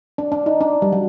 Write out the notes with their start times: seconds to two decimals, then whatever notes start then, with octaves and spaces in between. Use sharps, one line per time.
0.18 D4
0.32 D4
0.46 D#4
0.61 D4
0.82 G3
0.93 F#3